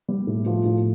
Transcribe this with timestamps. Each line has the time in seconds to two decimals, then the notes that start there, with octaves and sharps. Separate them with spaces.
0.09 G3
0.27 A2
0.46 F3
0.65 A2